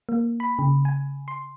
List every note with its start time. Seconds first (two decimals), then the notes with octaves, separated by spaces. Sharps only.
0.09 A#3
0.40 B5
0.59 C#3
0.85 G#5
1.28 C6